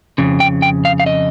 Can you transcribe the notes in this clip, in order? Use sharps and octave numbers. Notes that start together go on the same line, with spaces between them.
F2 C#3
G5
G5
F5
F5
D#5